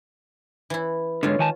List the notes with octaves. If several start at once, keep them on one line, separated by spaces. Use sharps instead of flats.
E3 E4
G#2 D3 F4 C#5
D#3 G#5 A5